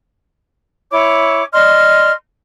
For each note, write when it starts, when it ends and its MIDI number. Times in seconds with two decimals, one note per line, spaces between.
0.92 1.42 64
0.92 1.42 73
0.92 1.42 86
1.53 2.11 74
1.53 2.11 75
1.53 2.11 84
1.53 2.11 89